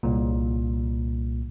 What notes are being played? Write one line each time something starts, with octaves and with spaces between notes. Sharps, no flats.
C2 A#2